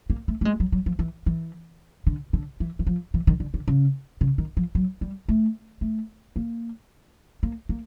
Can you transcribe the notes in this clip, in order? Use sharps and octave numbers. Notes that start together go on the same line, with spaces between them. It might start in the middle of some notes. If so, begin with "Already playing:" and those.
A#3
A3
A3
G#3
F#3
F#3
F3
E3
E3
D3
D3
E3
E3
F3
E3
D#3
D3
D3
C#3
C#3
D#3
F3
F#3
G3
A3
A3
A#3
A#3
A#3